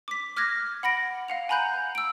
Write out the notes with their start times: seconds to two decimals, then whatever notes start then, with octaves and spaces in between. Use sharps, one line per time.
0.08 D6 B6
0.37 D6 F6 F#6 G#6 A#6
0.83 F#5 B5 A#6 D7
1.28 F5 F#5 F7
1.49 G#5 A#5 B5 F#6 G6
1.95 E6 D7